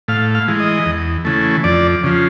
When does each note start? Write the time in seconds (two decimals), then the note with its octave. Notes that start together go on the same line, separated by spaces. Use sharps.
0.08 A2 F5
0.35 F5
0.48 E3 G#3
0.60 D#5
0.86 E2
1.25 C#3 E3 A3
1.64 F2 D5
2.03 C#3 F3